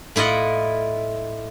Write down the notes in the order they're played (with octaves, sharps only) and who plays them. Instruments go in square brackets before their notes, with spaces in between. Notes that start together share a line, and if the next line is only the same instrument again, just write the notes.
[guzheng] A2 E4 F4 D#5 F#5